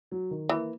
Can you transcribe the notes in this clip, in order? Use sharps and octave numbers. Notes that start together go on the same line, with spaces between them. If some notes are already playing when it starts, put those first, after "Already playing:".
F#3
D#3
E3 A#3